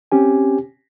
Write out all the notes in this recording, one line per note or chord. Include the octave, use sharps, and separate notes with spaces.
C4 C#4 G4 G#5